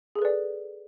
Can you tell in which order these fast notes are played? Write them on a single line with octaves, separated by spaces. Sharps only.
G#4 A4 B4 D5